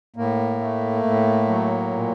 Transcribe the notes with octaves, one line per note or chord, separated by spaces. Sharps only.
A2 A#3
A3
A2
F#3
A#2